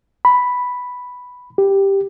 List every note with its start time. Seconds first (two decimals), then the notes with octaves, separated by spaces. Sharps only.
0.25 B5
1.58 G4